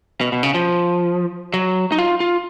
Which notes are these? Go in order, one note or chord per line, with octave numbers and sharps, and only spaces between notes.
B2
B2
C#3
F3
F#3
D#4
F4
F4